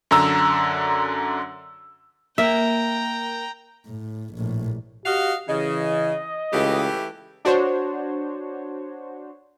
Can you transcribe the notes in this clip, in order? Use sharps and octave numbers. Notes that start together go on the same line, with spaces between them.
F#2 D3 A#5 E6
A#3 E5 G5 A#5
A2
A#1 A2
F#4 G4 D#5 F5
C#3 E3 D#5
C#2 E3 A3 G4
D4 F#4 C5 C#5